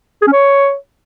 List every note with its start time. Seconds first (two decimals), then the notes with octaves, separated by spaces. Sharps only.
0.22 G#4
0.27 C#4
0.33 C#5